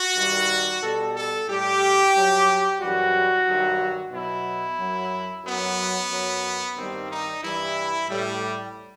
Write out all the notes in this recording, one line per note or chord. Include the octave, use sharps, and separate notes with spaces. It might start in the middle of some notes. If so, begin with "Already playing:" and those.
Already playing: F#4
G2 D#3 G3
B2 G3 A4
A4
A2 G3 G4
G2 F#3
F#2 E3 G3 F#4
G2 D#3 F#3
B2 F#3 E4
F#2 F#3
F#2 F#3 B3
F#2 F#3
G2 D#3 G3 C4
D#4
G2 E3 G3 E4
A2 G3